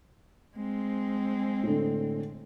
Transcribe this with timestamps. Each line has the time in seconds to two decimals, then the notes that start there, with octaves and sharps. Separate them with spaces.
0.55 G#3 C4
1.63 A2 D3